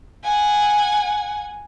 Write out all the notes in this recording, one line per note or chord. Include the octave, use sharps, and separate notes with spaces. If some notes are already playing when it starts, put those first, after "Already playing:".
F#5 G#5